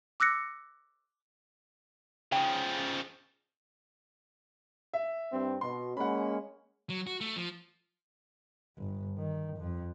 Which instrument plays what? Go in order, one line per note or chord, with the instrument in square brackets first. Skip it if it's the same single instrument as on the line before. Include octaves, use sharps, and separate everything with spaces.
[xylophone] D6 E6 F#6 A#6 C#7
[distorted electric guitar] C#3 F3 [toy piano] G5
[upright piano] E5
[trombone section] G2 C4
[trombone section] B2 [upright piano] C6
[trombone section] G#3 A#3 C#4 [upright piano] F#5 B5
[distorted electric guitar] F#3
F#4
A3
F3
[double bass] G1
D#3
F2